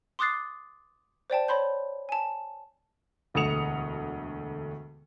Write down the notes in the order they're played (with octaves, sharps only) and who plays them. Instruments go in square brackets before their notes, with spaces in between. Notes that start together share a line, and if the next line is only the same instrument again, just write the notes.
[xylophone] C6 D6 D#6 F#6 A6 C7
C5 D5 G5 A5
C#5 B5 C6 G6
G#5 A5
[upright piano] E1 D2 A3 D#6 C#7 F7